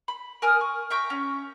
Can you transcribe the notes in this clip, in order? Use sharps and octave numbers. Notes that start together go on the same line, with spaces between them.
B5
A#4 G#5 D#6 F6
C#6
E5 G5 A#5 C#6
C#4